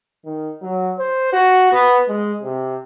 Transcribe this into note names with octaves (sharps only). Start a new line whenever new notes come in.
D#3
F#3
C5
F#4
B3
G#3
C3